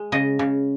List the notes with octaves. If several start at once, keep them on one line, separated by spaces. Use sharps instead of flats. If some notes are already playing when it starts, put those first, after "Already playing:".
Already playing: G#3
C#3 D#5
C#3